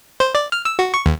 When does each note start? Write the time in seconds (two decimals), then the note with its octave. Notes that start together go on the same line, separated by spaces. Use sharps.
0.20 C5
0.35 D5
0.52 F6
0.65 E6
0.79 F#4
0.94 C#6
1.06 D#2